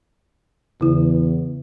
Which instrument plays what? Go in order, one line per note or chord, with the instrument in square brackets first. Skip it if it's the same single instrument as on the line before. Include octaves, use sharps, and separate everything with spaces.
[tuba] E2 [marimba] C#3 E4